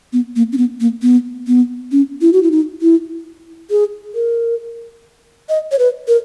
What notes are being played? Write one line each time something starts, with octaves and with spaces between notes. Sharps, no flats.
B3
A#3
C#4
B3
A#3
B3
B3
C#4
E4
F#4
E4
D#4
E4
G#4
A#4
D#5
C#5
B4
A#4